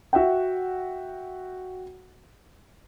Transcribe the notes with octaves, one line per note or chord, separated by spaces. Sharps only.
F#4 E5 F#5 G5